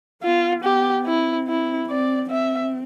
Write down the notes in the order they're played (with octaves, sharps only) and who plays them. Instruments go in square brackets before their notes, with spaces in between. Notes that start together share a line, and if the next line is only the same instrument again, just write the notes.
[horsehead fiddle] B3 [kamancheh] F4
[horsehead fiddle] B3 [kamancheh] G4
[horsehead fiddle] C4 [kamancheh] E4
[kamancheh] E4
[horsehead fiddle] C4 [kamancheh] D5
[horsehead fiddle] C4 [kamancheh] E5